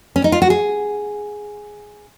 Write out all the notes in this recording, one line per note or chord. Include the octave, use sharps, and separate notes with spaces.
C#4
D#4
F4
F#4
G#4